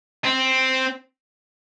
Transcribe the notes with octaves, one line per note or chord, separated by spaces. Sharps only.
C4